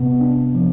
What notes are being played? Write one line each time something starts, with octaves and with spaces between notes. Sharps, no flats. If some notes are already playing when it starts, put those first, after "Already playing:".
Already playing: C3 B3
D4
F3